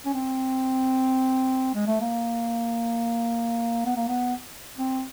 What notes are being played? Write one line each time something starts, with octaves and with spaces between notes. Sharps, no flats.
C#4
C4
G#3
A3
A#3
B3
A#3
B3
C4